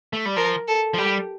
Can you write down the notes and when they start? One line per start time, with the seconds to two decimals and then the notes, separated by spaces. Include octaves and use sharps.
0.13 A3
0.25 G3
0.36 F3 A#4
0.68 A4
0.94 F3
0.98 G3 G4